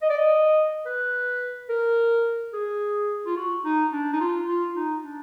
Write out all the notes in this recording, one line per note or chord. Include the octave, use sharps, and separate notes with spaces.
D#5
D5
D#5
B4
A#4
G#4
F4
F#4
D#4
D4
D#4
F4
F4
D#4
D4